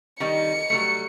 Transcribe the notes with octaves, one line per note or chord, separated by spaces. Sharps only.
D#3 G3 D#4 C#7
F#3 G3 A3